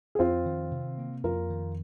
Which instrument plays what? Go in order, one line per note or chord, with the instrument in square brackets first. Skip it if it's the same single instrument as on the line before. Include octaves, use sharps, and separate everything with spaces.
[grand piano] G#4
[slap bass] F2 [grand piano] C4 F4
[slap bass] D#3
C3
A#3
[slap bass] F2 [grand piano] F4 A#4
[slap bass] D#3